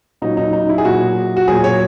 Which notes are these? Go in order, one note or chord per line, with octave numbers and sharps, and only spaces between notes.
A#2 F#3 D#4
D#4
D#4
E4
G#4
A#2 F#3 F#4
F#4
A#2 F#3 G#4
C#5